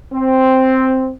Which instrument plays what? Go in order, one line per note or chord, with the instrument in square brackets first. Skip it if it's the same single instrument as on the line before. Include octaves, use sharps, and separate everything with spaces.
[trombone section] C4